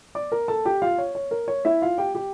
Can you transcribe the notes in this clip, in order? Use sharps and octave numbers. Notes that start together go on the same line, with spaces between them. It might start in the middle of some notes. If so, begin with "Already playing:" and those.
D5 D6
A#4 A#5
A4 A5
G4 G5
F4 F5
C#5
C#5
A#4
C#5
E4 E5
F4 F5
G4 G5
G4 G5